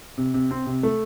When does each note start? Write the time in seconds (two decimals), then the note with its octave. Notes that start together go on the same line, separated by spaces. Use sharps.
0.18 C3
0.34 C3
0.51 C4
0.66 C3
0.83 A3